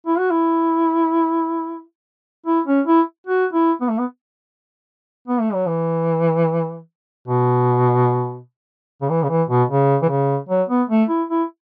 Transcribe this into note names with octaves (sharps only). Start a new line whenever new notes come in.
E4
F#4
E4
E4
C#4
E4
F#4
E4
B3
A3
B3
B3
A3
F#3
E3
B2
C#3
E3
C#3
E3
B2
C#3
E3
C#3
F#3
B3
A3
E4
E4